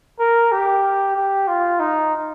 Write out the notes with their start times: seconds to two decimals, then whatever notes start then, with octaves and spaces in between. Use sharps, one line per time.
0.19 A#4
0.52 G4
1.17 G4
1.47 F4
1.80 D#4